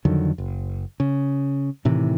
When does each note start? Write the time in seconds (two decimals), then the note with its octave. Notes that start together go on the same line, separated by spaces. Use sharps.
0.05 F2 D3 D#3 F#3
0.38 F#1
1.00 C#3
1.85 A2 C3 D#3 E3